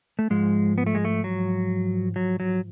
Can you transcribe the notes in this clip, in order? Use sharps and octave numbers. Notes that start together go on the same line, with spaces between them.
A3
G#2 F3 G#3
B3
A3
G#3
A3
F#3
F#3
F#3